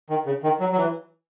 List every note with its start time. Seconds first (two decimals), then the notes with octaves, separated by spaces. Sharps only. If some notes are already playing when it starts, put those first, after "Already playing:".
0.10 D#3
0.26 C#3
0.43 D#3
0.60 F#3
0.72 F#3
0.77 E3